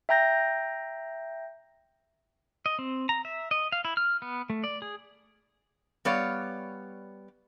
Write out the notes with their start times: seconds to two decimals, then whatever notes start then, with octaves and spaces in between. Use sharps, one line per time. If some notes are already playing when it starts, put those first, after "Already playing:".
0.09 E5 G5 A#5 G6 A#6
2.66 D#5
2.79 C4
3.09 A#5
3.25 E5
3.51 D#5
3.72 F5
3.85 E4
3.97 F6
4.22 B3
4.50 A3
4.64 D5
4.82 G#4
6.05 G3 B3 C#5 D5 F5